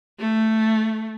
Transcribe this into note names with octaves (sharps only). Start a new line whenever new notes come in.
A3